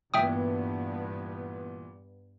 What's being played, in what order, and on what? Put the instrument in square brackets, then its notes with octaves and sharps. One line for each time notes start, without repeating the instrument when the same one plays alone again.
[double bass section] G2 B3 [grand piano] A#2 E3 [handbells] E5 G5 D#6